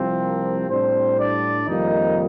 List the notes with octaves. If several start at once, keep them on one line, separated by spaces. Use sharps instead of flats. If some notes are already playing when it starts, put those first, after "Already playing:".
Already playing: C2 C3 F3 C4
A#3 A#4
A2 G3 C4 D4 C5
D4 D5
F2 C3 D#3 G3 A#3 D#4 D#5